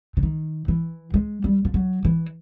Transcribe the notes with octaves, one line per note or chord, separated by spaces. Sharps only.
D3
D#3
E3
G#3
G3
F3
F#3
E3